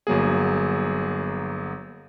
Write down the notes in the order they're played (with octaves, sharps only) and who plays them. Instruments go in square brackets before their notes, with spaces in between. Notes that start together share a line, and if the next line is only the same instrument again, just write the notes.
[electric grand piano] G1 F#3 A#3 G#4